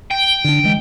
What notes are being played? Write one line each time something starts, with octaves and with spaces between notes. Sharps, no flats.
G5
D3 D4
E3 G#3